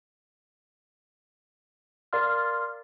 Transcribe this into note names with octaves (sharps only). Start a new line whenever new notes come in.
A#4 D5 F5 C6 F6